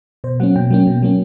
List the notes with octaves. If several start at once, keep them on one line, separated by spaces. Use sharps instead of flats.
B2 C5
F#3 A#3 C#4 F#5
B2 G5
F#3 A#3 C#4
B2
F#3 A#3 C#4